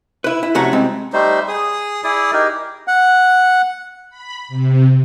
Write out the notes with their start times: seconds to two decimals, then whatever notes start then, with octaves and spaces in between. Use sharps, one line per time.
0.24 E4 B4
0.43 E4
0.55 F2 C3 A3 C#4 F#4 A#5
0.73 G3 G#3 C4
1.13 G3 A3 D#4 C5
1.48 G#4 D#6
2.04 E4 G#4 D5 D#6
2.33 D#4 G4 A#4
2.88 F#5
4.10 B5
4.48 C3